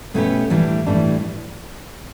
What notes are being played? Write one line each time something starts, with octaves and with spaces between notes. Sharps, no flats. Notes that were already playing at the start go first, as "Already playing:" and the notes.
B2 A3 C#4 G4 B4
A2 E3 G3 D4
A2 E3 G3 D4